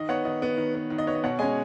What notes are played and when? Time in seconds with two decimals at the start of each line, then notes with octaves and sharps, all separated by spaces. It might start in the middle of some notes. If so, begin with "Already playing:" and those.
Already playing: D#3 D#5
0.09 B3 C#5 F#5
0.25 D#3 D#5
0.42 B3
0.57 D#3
0.75 B3
0.90 D#3
0.98 D#5
1.07 B3 C#5
1.15 D#5
1.23 B2 C#5 F#5
1.39 G#3 C#4 D#5 G#5